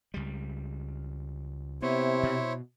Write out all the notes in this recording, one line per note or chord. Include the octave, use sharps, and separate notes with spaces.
C#2 G3
C3 B3 E4 C5 C#5
B2